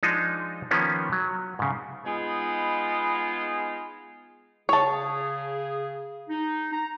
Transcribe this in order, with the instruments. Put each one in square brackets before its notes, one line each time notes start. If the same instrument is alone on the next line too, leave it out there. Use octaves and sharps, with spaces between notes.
[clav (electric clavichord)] F3 G#3 D4 D#4
D#3 F3 A#3 B3 C#4
F#3
G#2 C#3
[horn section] G#3 B3 D#4 F4 G#4
[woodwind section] C#3 G#4 [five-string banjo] C#5 A5
[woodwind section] D#4
A#5